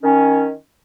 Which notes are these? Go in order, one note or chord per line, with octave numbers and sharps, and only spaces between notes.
D#3 C#4